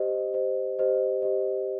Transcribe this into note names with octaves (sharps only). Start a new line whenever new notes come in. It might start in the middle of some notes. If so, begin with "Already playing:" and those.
Already playing: G4 C5 D#5
G4 C5 D#5
G4 C5 D#5
G4 C5 D#5